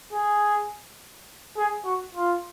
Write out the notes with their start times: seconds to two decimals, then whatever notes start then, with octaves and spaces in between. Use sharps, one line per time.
0.13 G#4
1.57 G#4
1.85 F#4
2.14 F4